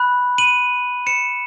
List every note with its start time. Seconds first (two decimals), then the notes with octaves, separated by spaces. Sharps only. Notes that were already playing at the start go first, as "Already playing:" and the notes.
Already playing: B5 F#6
0.38 D#7 F#7
1.06 C#7 E7